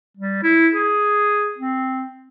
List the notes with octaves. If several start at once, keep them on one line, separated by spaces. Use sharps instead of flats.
G3
E4
G#4
C4